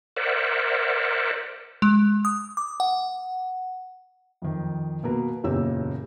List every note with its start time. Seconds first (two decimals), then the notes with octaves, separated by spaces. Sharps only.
0.16 A#4 C5 D5 E5 F#5
1.82 G#3
2.25 D#6
2.57 D6
2.80 F#5
4.42 F2 D#3
5.03 B2 A#3 A#4 B4
5.44 F#1 E2 A#2 C#4 G4 E6